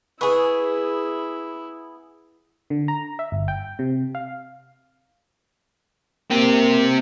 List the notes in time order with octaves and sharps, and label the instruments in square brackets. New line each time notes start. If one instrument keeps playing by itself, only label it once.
[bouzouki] B3 G#4 [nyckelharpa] E4 [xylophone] B4 B5 C#6
[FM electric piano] D3
A#5
E5
G1
G5
C3
F5
[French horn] A#3 [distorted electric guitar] C4 G4